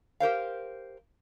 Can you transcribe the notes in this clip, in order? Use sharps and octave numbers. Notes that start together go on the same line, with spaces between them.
G4 A#4 C5 F5